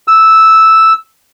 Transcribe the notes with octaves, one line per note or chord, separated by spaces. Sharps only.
E6